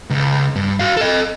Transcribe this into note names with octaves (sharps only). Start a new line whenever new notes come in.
C#2
G2
F#4 F5
A4 D#5